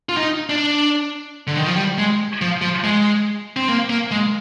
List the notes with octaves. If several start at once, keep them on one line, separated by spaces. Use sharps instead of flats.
F4
D#4
D4
D3
D#3
F3
G3
G#3
F3
F3
G#3
C4
A#3
A#3
G#3